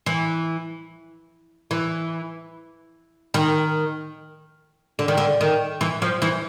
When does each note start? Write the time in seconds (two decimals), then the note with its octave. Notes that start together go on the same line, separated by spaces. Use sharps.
0.06 E3
1.71 E3
3.34 D#3
4.99 D3
5.08 D#3
5.17 D3
5.41 D#3
5.81 E3
6.02 F3
6.22 E3